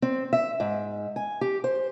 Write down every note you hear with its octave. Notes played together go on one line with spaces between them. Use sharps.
C4
E5
G#2
G#5
G4
C5